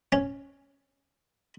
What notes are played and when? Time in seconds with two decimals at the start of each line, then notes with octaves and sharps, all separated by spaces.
0.12 C#4